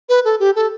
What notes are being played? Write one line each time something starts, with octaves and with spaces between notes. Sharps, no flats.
B4
A4
G4
A4